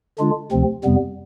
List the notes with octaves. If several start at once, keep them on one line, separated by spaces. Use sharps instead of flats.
D3 G#3 D4 F4
D2 C3 F3 C4
F2 C3 G3 B3